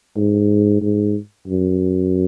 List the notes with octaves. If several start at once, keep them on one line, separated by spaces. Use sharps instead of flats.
G#2
G#2
F#2